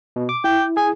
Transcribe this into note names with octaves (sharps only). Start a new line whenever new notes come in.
B2
D6
E4 G5
G#4 G#5